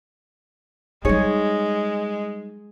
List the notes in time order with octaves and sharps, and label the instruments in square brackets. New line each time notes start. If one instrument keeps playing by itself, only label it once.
[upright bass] G3 D#4 [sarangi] G#3 [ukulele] G#4 C#5